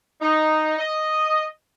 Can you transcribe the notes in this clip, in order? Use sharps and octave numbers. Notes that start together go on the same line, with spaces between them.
D#4
D#5